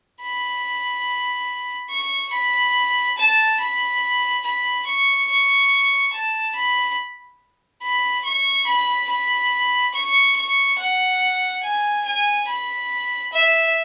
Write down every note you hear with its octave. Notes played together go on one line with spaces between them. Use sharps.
B5
C#6
B5
A5
B5
B5
C#6
C#6
A5
B5
B5
C#6
B5
B5
C#6
C#6
F#5
G#5
G#5
B5
E5